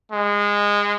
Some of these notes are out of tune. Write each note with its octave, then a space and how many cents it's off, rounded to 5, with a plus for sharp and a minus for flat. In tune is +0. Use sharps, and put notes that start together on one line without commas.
G#3 -20